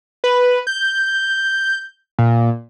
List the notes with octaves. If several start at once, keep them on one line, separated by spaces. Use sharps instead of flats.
B4
G6
A#2